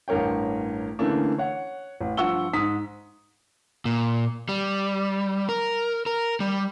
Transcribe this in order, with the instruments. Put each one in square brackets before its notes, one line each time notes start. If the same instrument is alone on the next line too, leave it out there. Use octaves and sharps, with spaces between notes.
[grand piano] A1 G2 A#4 C#5 G5
D3 E3 A3 A#3 C#4 D4
C#5 F#5
A1
G2 F3 F#5 C#6 E6 G7
G#2 D#6 B6
[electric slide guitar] A#2
G3
A#4
A#4
G3